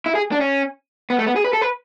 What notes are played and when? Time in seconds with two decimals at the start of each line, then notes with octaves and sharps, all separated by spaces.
0.06 E4
0.15 G#4
0.32 D4
0.41 C#4
1.10 B3
1.19 A3
1.26 B3
1.36 G#4
1.45 B4
1.53 A4
1.61 B4